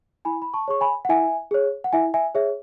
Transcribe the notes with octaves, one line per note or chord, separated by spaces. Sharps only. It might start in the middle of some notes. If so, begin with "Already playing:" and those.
E4 G#5 B5
B5
A5 C#6
G#4 C#5 C#6
G#5 B5
F#5
E4 E5 G#5
G#4 C#5
F#5
E4 E5 G#5
E5 G#5
G#4 C#5 E5